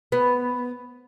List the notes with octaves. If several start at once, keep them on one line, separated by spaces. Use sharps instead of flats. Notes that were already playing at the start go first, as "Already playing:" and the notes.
B3